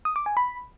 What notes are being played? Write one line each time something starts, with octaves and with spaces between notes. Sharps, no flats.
D#6
D6
G#5
B5